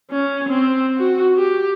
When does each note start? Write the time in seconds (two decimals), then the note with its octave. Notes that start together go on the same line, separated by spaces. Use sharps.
0.11 C#4
0.49 C4
0.98 F#4
1.36 G4